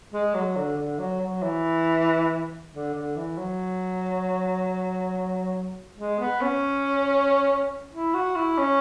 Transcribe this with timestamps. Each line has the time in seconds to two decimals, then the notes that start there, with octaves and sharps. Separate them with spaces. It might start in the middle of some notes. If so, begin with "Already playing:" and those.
0.12 G#3
0.34 F#3
0.56 D3
0.78 D3
0.99 F#3
1.21 F#3
1.43 E3
2.73 D3
2.94 D3
3.16 E3
3.38 F#3
5.97 G#3
6.19 B3
6.41 C#4
7.93 E4
8.14 F#4
8.36 E4
8.58 C#4